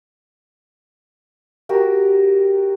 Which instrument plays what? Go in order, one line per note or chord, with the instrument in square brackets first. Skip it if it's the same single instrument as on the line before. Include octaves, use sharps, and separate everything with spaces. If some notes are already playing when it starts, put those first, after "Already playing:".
[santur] F#4 G4 A#4